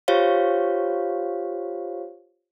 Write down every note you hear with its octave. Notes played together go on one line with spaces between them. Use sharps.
F4 G4 C5 C#5 F5